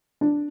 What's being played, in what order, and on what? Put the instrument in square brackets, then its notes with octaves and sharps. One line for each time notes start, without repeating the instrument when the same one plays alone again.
[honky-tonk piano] D4